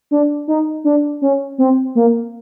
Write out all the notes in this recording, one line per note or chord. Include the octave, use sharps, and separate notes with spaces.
D4
D#4
D4
C#4
C4
A#3